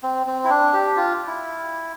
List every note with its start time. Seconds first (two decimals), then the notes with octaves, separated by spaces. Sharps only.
0.03 C4
0.27 C4
0.45 E4
0.50 D4
0.73 G4
0.97 F4
1.27 E4